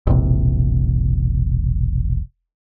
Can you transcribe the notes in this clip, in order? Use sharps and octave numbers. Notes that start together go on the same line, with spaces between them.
E1 A#1 C3